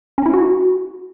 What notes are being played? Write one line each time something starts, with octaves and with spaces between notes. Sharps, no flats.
C#4
E4
F#4